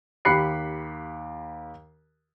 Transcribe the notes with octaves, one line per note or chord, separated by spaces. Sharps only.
D#2 G4 B5 F#6 C7 C#7